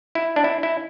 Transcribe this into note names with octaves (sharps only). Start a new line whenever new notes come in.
E4
D4
E4
E4